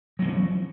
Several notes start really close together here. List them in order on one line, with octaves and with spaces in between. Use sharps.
F#3 A#3 E3 C#4